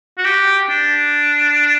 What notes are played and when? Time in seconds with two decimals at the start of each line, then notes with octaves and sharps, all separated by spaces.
0.18 F#4
0.25 G4
0.69 D4